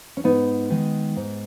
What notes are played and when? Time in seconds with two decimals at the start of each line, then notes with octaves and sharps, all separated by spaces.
0.17 C#4
0.24 G#2 B3 D#4
0.70 D#3 G#3
1.16 G#2